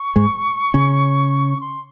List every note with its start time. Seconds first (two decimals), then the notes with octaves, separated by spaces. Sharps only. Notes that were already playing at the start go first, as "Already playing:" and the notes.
Already playing: C#6
0.16 G#2 G#3
0.74 C#3 C#4
1.61 C6